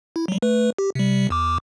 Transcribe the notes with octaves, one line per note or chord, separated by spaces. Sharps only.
E4
F#3 G3
A3 B4
G4
C3 G3
E2 D6